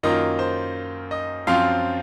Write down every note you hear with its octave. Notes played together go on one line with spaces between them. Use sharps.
F#2 D#3 A#3 F4 D#5
C5
D#5
F#2 F3 C4 F4 F5